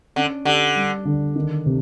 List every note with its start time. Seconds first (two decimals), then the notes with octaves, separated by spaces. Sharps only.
0.16 D3 C#4
0.45 D3 G4
0.76 G3
1.05 D3
1.36 D#3
1.66 C3